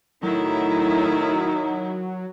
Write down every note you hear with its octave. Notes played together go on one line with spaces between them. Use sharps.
A2 D#3 F#3 D#4 E4